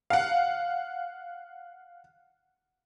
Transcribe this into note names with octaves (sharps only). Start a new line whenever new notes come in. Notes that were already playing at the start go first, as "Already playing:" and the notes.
F5 F#5